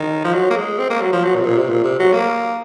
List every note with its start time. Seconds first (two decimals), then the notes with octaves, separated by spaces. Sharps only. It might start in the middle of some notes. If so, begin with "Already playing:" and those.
Already playing: D#3
0.24 F3
0.34 F#3
0.50 A#3
0.56 G#3
0.79 C4
0.90 A#3
1.01 F#3
1.13 F3
1.24 F#3
1.35 A#2
1.41 C3
1.46 A#2
1.57 C3
1.69 A#2
1.84 C3
1.99 F#3
2.13 A#3